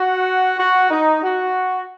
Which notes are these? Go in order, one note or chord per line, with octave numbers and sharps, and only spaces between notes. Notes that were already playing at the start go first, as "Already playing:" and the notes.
Already playing: F#4
F#4
D#4
F#4